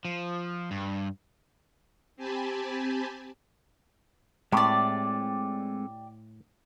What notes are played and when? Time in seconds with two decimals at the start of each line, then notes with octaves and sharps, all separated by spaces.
0.05 F3
0.71 G2
2.17 C4 G4 G#5 A5 B5
4.52 A2 G#3 A3 C4 G4 D5